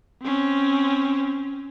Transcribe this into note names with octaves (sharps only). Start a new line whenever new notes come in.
C4 C#4